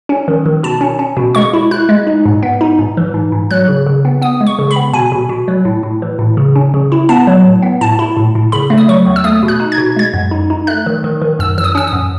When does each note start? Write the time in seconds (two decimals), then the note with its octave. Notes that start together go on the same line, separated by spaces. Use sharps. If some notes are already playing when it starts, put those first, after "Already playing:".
0.09 C#4
0.28 D#3
0.46 D#3
0.63 B2 A5
0.81 C#4
0.99 C#4
1.17 B2
1.35 G#3 C#6
1.53 E4
1.71 E4 F#6
1.89 G#3
2.07 D#4
2.26 G#2
2.43 B3
2.61 D#4
2.79 G#2
2.97 E3
3.14 G#2
3.32 G#2
3.51 F#3 F#6
3.68 C#3
3.87 C#3
4.05 B3
4.22 B3 D#6
4.41 G#3
4.47 C#6
4.59 C#3
4.71 B5
4.76 B3
4.93 B2 G#5
5.12 B2
5.29 B2
5.48 F#3
5.65 A2
5.83 A2
6.02 E3
6.19 A2
6.37 C#3
6.56 C#4
6.74 C#3
6.92 E4
7.09 B3 A5
7.27 F#3
7.45 A2
7.62 B3
7.81 A2 A5
7.99 E4
8.17 A2
8.35 A2
8.52 C#3 B5
8.70 A3
8.78 D#6
8.88 F#3 C#6
9.06 E2
9.16 E6
9.24 A3 D#6
9.43 B2
9.48 F#6
9.60 D#4
9.72 G#6
9.78 B2
9.96 G#3 G#6
10.14 F#2
10.31 D#4
10.50 D#4
10.67 A3 F#6
10.86 D#3
11.04 D#3
11.22 D#3
11.39 F#2 E6
11.58 E3 E6
11.64 D#6
11.75 C#4 E6
11.87 D#6
11.93 F#2